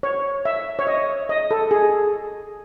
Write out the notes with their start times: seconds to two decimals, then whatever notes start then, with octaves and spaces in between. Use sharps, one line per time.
0.03 C#5
0.45 E5
0.79 C#5
0.87 D#5
1.29 D#5
1.51 A4
1.71 G#4